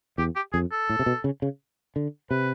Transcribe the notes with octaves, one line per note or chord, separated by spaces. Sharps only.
E2 G4
G4
F2 G#4
A4
A2
C3
B2
C#3
C#3
D3
C3 B4